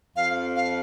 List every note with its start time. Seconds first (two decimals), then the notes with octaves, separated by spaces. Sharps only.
0.16 F2 F5
0.56 F5